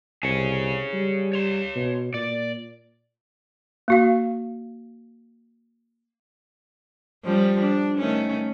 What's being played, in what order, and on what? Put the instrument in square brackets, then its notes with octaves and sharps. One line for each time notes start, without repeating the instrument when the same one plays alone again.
[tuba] C2 [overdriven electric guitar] G#4 C#5
[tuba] G3
[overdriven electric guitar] C#5 C6
[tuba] B2
[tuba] A#2 [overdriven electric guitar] D5
[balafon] A#3 F#4 F5
[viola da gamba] F3 G3 C#4
D4
D#3 A3 C#4